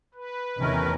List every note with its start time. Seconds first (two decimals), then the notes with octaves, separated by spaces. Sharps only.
0.15 B4
0.61 E2 C3 D#3 A3 C#4 A#4